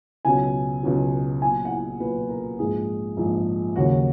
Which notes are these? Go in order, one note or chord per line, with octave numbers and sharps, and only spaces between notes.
C#2 B2 F#3 G#5
C#2 B2 F#3
B1 A#2 F#3 G#5
F#5
G#5
B1 A#2 F#3 B4
A#4
A#1 G#2 F3 G#4
A#1 G#2 F3
D#2 C#3 F#3 F#4